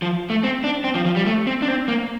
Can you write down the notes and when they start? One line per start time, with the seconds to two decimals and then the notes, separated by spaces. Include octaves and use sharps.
0.02 F3
0.30 A3
0.43 C4
0.64 D4
0.84 C4
0.95 F3
1.06 F3
1.16 G3
1.26 A3
1.47 C4
1.62 D4
1.68 C4
1.88 A#3